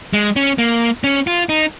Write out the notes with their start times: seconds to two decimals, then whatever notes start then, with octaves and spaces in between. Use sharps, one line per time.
0.13 G#3
0.36 C#4
0.58 A#3
1.04 C#4
1.27 F4
1.49 D#4